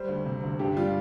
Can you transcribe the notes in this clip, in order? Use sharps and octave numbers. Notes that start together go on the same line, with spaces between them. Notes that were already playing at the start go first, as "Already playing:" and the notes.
Already playing: G3 C5
D2
C3
D2
G2 G4
G3 F4